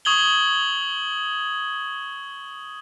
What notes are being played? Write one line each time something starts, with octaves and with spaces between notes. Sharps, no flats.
C#6 D#6 G#6 F#7 G7